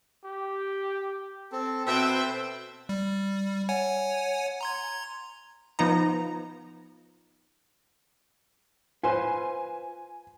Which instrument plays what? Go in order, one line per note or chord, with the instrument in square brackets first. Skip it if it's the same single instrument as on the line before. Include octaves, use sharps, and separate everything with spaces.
[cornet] G4
[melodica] C4 [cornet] A4
[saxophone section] B2 C4 [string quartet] B4 E5 G5 [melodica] C5
[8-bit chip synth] G3
C#5 F#5 G#5
A#5 C6 G#6
[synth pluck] F3 B3 D#4 A#5
[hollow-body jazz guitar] F4 B4 C5 [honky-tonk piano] G#5